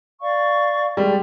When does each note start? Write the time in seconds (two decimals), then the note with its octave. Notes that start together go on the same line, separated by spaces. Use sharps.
0.21 D5 F5 C#6
0.97 G3 G#3